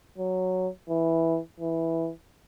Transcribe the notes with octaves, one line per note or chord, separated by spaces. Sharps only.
F#3
E3
E3